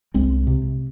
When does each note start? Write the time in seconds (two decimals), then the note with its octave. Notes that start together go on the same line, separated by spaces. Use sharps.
0.14 C2 G#3 C4
0.47 C3